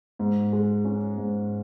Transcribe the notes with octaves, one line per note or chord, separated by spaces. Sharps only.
G#2
G#3
C#4
G#2